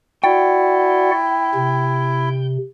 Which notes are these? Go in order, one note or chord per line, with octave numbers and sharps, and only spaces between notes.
E4 F#4 D5 F#5 G5
C3